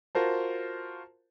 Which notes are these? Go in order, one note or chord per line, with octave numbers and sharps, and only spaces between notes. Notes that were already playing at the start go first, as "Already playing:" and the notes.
F4 F#4 A#4 C5 A5